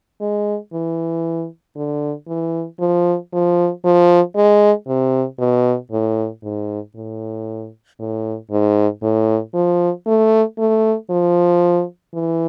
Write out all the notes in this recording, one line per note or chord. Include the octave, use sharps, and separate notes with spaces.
G#3
E3
D3
E3
F3
F3
F3
G#3
C3
B2
A2
G#2
A2
A2
G#2
A2
F3
A3
A3
F3
E3